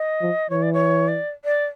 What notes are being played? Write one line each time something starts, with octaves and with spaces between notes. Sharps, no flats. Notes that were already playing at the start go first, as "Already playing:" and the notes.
Already playing: D#5
F3
E3 C#5
D5
C#5
D5
D5